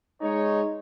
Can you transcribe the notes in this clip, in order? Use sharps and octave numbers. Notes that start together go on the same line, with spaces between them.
G#3 D#4 C#5